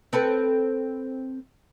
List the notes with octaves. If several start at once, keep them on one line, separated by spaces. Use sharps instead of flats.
C4 A4 B4